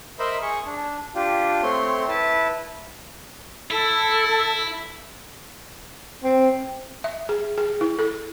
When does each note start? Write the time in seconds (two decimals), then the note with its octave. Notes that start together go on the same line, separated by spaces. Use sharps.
0.19 A#4 C5 D#5 E5 B5
0.42 G#4 C#6
0.67 D4
1.15 D4 F4 G4
1.63 A3 C4 C#5 C6
2.08 E4 B4 A5
3.71 E4 A4
6.24 C4
7.04 E5
7.29 G#4
7.58 G#4
7.81 E4
7.99 A4